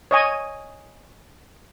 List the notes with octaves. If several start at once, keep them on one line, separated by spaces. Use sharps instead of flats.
C#5 D#5 G#5